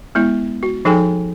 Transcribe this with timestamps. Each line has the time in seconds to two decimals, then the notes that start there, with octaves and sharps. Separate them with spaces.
0.15 G#3 B3 E4
0.63 F#4
0.85 F3 D#4 G#4 A4 G5 G#5